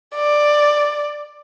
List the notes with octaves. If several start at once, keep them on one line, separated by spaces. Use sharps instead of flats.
D5